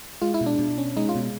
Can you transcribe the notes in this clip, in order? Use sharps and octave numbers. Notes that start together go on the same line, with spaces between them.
G#3 F4
E4
B2
D4
B2
C#4
G#3 D#4
F4
B2